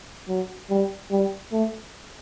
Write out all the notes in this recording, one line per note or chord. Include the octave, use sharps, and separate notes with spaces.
F#3
G3
G3
A3